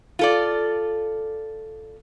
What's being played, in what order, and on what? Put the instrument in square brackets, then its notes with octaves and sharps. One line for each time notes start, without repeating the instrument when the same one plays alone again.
[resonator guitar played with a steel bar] F4 A4 D5